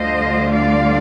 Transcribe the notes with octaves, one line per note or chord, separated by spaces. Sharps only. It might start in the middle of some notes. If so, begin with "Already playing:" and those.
Already playing: D2 D3 G3 D4 F4 C5 D#5
D5 F5